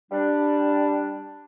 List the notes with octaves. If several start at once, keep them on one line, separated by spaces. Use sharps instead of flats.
G3 D4